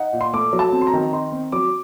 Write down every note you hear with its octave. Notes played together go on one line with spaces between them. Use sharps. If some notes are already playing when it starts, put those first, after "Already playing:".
Already playing: D#4 F#5
A#2
C6
A3 D6
F#3
A5
C4
C6
A#5
D#3
D#4 C6
C4
F#3 D6